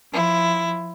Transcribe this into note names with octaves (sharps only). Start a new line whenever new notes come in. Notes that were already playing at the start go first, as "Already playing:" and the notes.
F3 E4